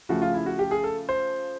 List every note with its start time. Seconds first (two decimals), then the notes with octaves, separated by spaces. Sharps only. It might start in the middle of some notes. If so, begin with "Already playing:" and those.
0.09 C#3 F3 A3 F#4
0.22 F4
0.34 E4
0.46 F#4
0.59 G4
0.71 G#4
0.84 A4
1.09 C5